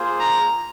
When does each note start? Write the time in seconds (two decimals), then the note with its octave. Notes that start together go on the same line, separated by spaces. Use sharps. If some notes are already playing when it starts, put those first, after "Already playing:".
Already playing: A#3 F4 G#4 C5
0.20 A#5